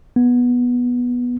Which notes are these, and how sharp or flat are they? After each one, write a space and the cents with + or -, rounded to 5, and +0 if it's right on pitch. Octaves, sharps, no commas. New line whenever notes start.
B3 -10